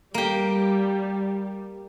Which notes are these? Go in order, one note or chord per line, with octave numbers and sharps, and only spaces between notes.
G3 A#3 G4